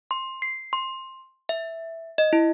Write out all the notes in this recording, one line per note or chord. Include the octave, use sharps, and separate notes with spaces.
C6
C7
C6
E5
D#5
E4